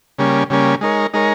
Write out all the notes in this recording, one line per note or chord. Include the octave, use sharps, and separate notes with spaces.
C#3 G3 A#3 C#4
C#3 G3 A#3 C#4
G#3 D#4 A#4 C#5
G#3 D#4 A#4 C#5